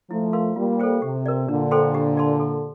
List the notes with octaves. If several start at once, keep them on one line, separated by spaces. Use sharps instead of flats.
F3 A3 E4
A#4 F5 C6
G3 A#3 F4
A4 C5 G5
C3 G4
A#4 D5
A#2 D3 D4
A4 C5 G5 C6
G4
D5 A5 C6
A4